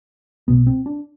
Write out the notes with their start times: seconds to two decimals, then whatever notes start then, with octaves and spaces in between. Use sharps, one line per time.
0.48 B1 B2 B3
0.67 C4
0.86 D4